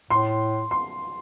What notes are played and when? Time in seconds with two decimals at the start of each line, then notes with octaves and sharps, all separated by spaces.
0.10 A2 C6
0.71 C6